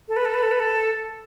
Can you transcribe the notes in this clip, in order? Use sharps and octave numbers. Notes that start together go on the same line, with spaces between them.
A4
B4
A4
B4
A4
B4
A4